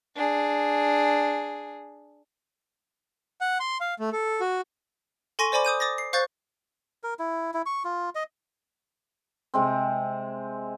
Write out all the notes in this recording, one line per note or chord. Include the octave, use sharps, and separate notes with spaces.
D4 G#4
F#5
C6
F5
A3
A4
F#4
A4 G#5 C6 C#6 A#6 D#7
C5 D5 G#5 B5 D6
D6 D#6 G6 D#7
D6 D#6 A6 A#6
C7
C5 F5 C#6 F#6 G6 A6
A#4
E4
E4
C#6
F4
D#5
C3 G#3 C4